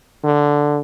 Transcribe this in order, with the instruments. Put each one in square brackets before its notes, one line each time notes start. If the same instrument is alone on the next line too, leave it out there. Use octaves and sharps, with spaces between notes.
[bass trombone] D3